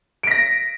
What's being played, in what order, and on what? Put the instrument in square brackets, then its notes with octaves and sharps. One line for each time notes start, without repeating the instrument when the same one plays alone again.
[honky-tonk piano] D7
B6
A#6